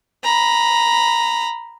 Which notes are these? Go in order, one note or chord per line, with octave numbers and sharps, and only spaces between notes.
A#5 B5